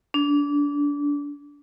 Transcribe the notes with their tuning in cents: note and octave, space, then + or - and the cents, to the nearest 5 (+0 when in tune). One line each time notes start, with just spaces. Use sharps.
D4 -25